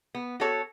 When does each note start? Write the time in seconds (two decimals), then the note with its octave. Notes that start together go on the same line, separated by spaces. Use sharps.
0.15 B3
0.40 F#4 A4 C#5